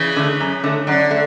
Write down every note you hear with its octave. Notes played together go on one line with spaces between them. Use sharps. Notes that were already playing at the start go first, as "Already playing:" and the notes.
Already playing: C#3 E3
D3 A3
F#2
D3 A3
F#2 D3
A3